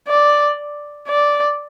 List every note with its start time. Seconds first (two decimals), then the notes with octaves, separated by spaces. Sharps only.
0.08 D5
1.08 D5